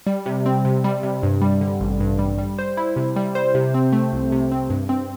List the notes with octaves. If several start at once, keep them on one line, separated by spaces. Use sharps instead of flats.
G3
C3
C4
C3
G3
C3
G2
G3
D3
A1
G2
G3
G3
C5
E4
C3
G3
C5
C3
C4
A3
C2
C3
C4
G2
C4